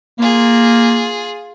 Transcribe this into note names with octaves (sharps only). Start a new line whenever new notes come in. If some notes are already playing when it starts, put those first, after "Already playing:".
A#3 F4 G#4